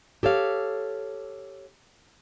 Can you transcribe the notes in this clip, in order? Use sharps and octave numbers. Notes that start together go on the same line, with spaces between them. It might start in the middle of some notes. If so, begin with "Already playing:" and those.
G4 A4 C#5 F5